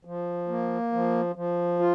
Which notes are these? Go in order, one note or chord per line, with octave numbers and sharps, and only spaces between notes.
F3
A#3
F3
F3
F4